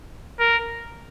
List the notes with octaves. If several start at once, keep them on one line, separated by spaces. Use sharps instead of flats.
A#4